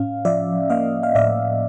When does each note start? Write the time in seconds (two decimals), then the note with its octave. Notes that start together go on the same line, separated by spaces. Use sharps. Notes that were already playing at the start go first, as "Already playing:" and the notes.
Already playing: A2 C#4 F5
0.25 F3 D5 E5
0.70 A#3 D#5 F5
1.03 F5
1.15 A2 D5 E5